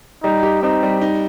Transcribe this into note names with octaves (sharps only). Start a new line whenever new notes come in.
G3 D#4
G4
C4 D#4
G3
D#4